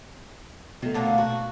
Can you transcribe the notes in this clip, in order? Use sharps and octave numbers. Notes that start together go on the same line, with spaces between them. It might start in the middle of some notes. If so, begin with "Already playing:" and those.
B2 D#3 A3
A#2 D3 A#3
F#4